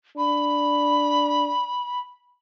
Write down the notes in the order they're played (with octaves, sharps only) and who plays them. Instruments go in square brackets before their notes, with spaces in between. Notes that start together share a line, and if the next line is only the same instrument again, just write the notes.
[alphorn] D4 [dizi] B5